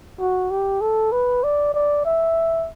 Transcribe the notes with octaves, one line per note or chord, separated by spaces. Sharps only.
F#4
G4
A4
B4
D5
D5
E5